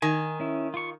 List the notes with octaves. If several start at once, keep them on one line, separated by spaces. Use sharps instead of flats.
D#3 G#5
C#4 E4
F4 C#6